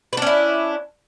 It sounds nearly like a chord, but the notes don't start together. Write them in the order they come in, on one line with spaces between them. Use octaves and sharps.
B4 D4 C#4 E4